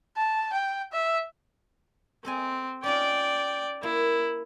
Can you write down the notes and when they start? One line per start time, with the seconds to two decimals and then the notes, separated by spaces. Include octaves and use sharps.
0.17 A5
0.53 G5
0.92 E5
2.25 C4 A4 D#5 G#5
2.83 C#4 D#4 F4 D5 G5
3.83 A#3 E4